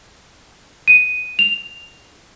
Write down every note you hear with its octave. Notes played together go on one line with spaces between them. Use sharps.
D#7
F7